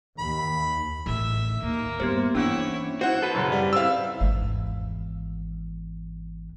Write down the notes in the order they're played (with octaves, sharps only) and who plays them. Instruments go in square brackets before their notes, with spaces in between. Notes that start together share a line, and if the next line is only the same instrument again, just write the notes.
[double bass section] D#2 [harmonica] B5
[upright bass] A1 D#3 [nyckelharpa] E5
[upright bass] D#2 [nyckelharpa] A#3
[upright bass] G2 [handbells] B3 G4 C5
[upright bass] E3 [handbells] C#4 D4 [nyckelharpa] E4 C#5
[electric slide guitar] E4 F#4 [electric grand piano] C5 F#5
[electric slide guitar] A4 B4
[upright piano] F#2 C#3
G3
[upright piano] C4 E4 [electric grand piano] F5 E6
[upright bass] G#1 E2